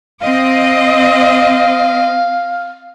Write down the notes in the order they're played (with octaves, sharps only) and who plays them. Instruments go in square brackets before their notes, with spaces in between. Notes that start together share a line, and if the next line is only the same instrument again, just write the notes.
[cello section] C4 D#5 [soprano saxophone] F5